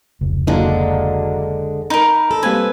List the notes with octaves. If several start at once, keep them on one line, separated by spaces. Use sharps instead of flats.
F1 C#2
D3 F#3 G#3 A#3 D4
D#4 A#4 B5
A4
G3 A#3 C4 B4 G#5